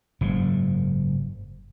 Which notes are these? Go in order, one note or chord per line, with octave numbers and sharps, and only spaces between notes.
F#1 G#2